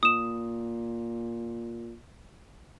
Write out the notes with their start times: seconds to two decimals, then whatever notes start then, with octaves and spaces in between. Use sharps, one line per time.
0.03 A#2 D#6 E7